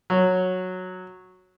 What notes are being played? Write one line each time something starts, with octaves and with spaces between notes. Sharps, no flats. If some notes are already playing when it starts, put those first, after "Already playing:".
F#3